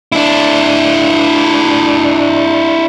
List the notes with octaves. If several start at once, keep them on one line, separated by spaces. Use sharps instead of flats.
D4 E4